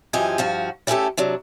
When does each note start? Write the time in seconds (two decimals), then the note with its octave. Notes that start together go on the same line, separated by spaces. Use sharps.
0.13 F#2 E3 F3 G4 D#5 G#5
0.38 G2 F3 F#4
0.87 G3 A3 C#4 E4 G4 A4
1.17 C3 F#3 D4